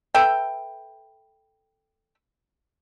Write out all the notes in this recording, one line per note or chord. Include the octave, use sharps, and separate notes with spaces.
A4 B4 E5 G5